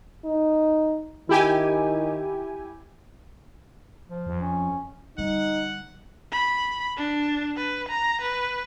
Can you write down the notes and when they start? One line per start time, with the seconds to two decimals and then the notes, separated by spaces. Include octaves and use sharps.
0.25 D#4
1.29 D#3 E4 G4 G#5
4.09 F3
4.26 F2
4.41 C#4
5.18 D3 G3 D#4 F#5
6.32 B5
6.97 D4
7.56 B4
7.89 A#5
8.21 B4